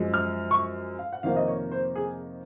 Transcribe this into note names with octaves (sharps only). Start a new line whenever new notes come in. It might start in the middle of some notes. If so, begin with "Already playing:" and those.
Already playing: F#2 F3 G#3
F6
C#6
F5
F#5
F2 C3 D#3 A#3 F5
D#5
C#5
C5
G#4